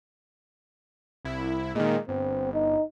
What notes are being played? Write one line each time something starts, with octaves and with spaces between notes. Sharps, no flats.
C2 E4
A#2 D#3 G#3
G1 C4
D#4